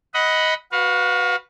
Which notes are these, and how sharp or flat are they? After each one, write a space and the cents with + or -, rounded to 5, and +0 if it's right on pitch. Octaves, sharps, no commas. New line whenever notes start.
D#5 +15 F#5 +0 B5 +0
F#4 +0 B4 +0 F5 +30